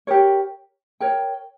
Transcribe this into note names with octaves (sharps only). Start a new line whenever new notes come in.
G4 A#4 C#5
A#4 C#5 G5